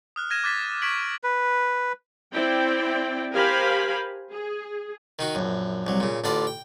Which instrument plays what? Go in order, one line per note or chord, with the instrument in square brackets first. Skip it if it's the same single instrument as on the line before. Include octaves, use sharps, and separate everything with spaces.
[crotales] D#6 F6 F#6
F6 G#6 A#6 D#7 E7
D6 F#6 A6 B6
C#6 G#6 B6 D7 F#7
[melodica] B4
[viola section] C4 E4 D5 G5
G4 A#4 C5 F5 G#5 B5
G#4
[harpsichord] D#3 D#4 F#4
A#1 F#2
C2 F#3
A#2 C#3
A1 D3 F4 D5 A#5
G5